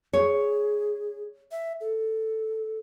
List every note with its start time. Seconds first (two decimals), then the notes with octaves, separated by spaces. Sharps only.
0.13 G#4 C#5
1.51 E5
1.81 A4